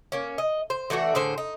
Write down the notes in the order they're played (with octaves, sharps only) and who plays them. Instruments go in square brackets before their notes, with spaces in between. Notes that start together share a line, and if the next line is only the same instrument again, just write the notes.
[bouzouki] A#3 C#4
D#5
C5
E3 A3 D4 F#4
A2 D3 G#4 C5
D#4